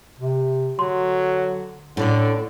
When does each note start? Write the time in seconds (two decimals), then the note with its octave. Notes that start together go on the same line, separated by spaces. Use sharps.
0.19 C3
0.79 D3 F#3 C6
1.97 A2 D3 C#4 D5